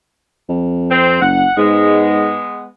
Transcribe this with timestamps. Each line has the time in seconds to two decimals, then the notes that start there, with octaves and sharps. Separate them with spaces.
0.49 F2
0.91 C4
1.22 F#1 F#5
1.57 G#2 G#3 B3